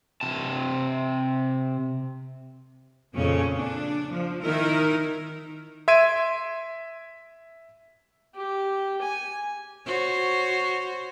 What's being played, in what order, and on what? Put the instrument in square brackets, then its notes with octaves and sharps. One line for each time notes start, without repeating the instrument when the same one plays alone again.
[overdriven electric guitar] C3 A5
[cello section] F2 A#2 C#3 C#4
D4
F3
D#3 D#4 E4 A#4
[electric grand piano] E5 C6 G#6 D7 D#7
[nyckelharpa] G4
G#5
[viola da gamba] F#4 C5 C#5